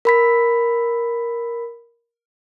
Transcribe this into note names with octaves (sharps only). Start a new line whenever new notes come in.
A#4 B5 B6